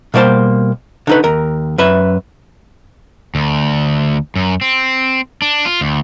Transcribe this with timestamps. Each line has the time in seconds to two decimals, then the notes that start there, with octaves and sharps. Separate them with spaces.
0.14 B2 G3 A#3 C5 A5
1.07 D3 D#4 B4
1.24 D#2 A#4
1.78 F#2 B4 E5
3.35 D2
4.36 F#2
4.61 C4
5.42 D4
5.65 F4
5.81 D2